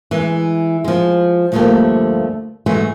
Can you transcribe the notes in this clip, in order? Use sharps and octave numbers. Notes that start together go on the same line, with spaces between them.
E3 G#3
F3 G#3
D2 G2 F3 A3 A#3 G4
G#2 E3 F#3 G#3 A3